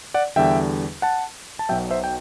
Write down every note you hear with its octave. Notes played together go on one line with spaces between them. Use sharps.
D5 F#5
E2 D3 G3 E5 G5
F#5 A5
A5
B1 B2 F#3 E5 G5
C5 E5
G5